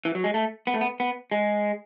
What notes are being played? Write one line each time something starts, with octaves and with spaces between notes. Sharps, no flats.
E3
F#3
G#3
A3
B3
A3
B3
B3
G#3